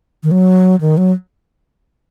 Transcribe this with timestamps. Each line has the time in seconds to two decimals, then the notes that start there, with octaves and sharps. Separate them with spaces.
0.23 D#3
0.31 F#3
0.81 D#3
0.97 F#3